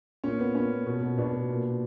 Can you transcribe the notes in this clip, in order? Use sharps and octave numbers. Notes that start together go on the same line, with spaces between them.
A#2 C#4
A#2 B3
A#2 C#4
A#2
B2
B2
B2 B3 D4
B2
A#2
A#2